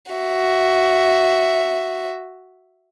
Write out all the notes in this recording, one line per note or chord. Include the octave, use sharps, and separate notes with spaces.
F#4 E5